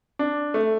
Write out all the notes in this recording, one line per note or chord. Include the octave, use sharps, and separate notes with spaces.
D4
A3